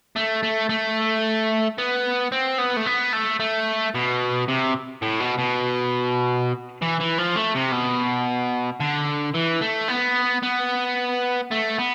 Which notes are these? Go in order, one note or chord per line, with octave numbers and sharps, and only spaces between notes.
A3
A3
A3
B3
C4
B3
A3
B3
A3
A3
B2
C3
A2
B2
B2
E3
E3
F3
A3
C3
B2
D3
E3
A3
B3
B3
A3
B3